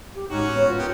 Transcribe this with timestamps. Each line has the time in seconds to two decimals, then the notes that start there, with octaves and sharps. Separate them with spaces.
0.15 G4
0.30 A2 G#3 C#4 D#4 F#4
0.54 G#1 B3 C#5
0.67 F4
0.78 B3 D4 G4 A#4